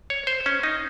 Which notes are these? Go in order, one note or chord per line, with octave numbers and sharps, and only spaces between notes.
C#5
C5
C#4
D#4